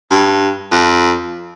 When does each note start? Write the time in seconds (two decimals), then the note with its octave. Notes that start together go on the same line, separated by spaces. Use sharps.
0.11 G2
0.71 F2